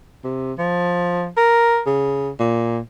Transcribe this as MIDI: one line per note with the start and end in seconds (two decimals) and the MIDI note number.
0.24 0.53 48
0.58 1.28 53
1.37 1.81 70
1.86 2.31 49
2.39 2.79 46